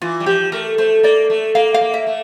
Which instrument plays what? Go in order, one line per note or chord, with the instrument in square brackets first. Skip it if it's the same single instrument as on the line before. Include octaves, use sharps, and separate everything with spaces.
[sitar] E3 [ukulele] F4
[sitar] G3
[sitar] F3 [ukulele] G4
[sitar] A3 [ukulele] A#4
[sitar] A3 [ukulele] C5
[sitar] A#3 [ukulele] D5
[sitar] A3
[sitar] A#3 [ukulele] F5
[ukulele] F5
[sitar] A#3
[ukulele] E5
[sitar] A3